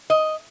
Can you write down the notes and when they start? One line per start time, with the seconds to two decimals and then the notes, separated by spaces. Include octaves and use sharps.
0.10 D#5